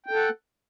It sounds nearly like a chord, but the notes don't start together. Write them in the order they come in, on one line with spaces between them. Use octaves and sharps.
G5 A4 F#5